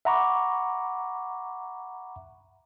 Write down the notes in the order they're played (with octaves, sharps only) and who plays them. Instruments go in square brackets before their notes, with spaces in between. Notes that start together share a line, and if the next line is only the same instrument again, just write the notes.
[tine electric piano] E5 F#5 A#5 B5 C#6 D6